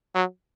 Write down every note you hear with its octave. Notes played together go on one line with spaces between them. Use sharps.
F#3